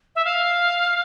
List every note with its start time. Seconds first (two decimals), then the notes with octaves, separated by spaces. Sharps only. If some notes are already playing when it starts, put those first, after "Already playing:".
0.16 E5
0.25 F5